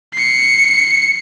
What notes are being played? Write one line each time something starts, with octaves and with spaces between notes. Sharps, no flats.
C7 C#7